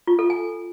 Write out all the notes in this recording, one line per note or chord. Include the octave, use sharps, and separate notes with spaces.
F4
A4
G#5